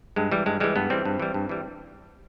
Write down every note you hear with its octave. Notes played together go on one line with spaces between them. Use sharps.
G2 G#3
E3 G3
G2 G#3
E3 G3 G#3
G2 B3
E3 G3 C4
G2
E3 G3
G2
E3 G3